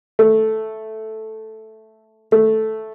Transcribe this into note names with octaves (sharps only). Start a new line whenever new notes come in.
A3
A3